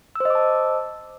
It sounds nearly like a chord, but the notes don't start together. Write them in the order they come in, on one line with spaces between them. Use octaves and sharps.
E6 C5 D#5 D6 A5